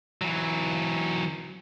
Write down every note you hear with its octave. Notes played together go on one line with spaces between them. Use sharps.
E3 F#3